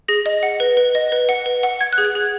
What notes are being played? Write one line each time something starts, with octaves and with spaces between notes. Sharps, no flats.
G#4 A#6
D#5
F#5
B4
B4
D#5
B4
F#5
B4
F#5
F#5 G#6
F#6
G#4
G#6
G#4